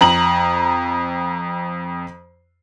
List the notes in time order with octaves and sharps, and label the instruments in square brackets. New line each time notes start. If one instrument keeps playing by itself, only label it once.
[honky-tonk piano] F2 A#5 F#7